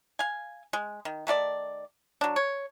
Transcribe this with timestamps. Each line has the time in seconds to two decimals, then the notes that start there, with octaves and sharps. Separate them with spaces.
0.19 F5 G#5
0.73 G#3
1.05 D#3
1.27 D#3 A3 F4 D5
2.21 F#3 D4
2.36 C#5